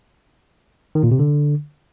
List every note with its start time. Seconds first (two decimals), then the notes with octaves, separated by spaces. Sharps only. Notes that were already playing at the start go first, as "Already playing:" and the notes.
0.95 D#3
1.03 A#2
1.11 C3
1.19 D3